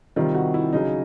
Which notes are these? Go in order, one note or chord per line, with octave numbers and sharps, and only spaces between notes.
C3 D#3 G3 F4
F#4
E4
C#3 F#3 D#4